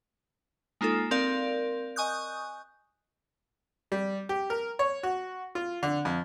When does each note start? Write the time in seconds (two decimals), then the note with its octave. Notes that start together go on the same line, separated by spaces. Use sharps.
0.81 G#3 A#3 D#4 F4 A4
1.11 C4 A#4 D5 F5
1.96 D#5 G#5 C#6 D#6 F#6 G6
3.92 G3
4.29 G4
4.50 A#4
4.79 C#5
5.03 F#4
5.55 F4
5.83 D3
6.05 F2